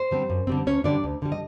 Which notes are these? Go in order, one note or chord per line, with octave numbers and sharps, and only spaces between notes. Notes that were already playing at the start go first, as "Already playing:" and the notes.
Already playing: C5
D3 G3 C4
F#2
D3 G3 C4
D2 C#4 C#5
D3 G3 D4 D5
D2
D3 G3
D#5